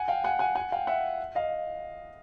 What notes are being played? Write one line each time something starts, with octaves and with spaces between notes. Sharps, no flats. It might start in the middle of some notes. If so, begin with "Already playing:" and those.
Already playing: F#5 G#5
F5 G5
F#5 G#5
F#5 G#5
F#5 G#5
F5 G5
E5 F#5
D#5 F5